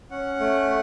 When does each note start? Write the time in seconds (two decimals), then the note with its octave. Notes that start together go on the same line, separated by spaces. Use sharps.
0.11 C#4 F#5
0.40 A3